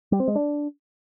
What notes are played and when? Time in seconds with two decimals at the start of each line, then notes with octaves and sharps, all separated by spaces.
0.12 G3
0.20 C4
0.28 G#3
0.35 D4